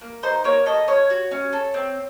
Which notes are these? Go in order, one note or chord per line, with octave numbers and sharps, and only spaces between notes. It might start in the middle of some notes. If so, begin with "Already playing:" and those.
A#3
D#4 C5
A#3 C#5
A4 D#5
C#4 C#5
F#4
C#4
A4
C4